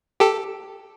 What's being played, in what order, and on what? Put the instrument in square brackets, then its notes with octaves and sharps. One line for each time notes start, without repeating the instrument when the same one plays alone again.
[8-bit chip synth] G4 A4